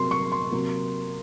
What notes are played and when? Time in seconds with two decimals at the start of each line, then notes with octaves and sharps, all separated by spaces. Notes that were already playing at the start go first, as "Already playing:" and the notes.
Already playing: C3 F#3 A#3 C6
0.11 C#6
0.32 C6
0.52 C3 F#3 A#3